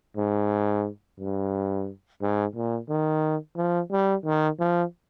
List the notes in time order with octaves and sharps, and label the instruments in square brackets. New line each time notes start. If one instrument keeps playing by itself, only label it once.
[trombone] G#2
G2
G#2
A#2
D#3
F3
G3
D#3
F3